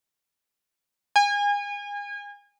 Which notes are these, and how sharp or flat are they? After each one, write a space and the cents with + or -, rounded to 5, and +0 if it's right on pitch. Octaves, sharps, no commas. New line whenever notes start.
G#5 -30